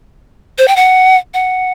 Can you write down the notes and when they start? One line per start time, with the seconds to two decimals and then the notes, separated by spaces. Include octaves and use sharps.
0.58 C5
0.68 G5
0.76 F#5
1.34 F#5